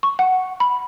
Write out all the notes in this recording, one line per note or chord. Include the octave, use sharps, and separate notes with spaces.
C#6
F#5
B5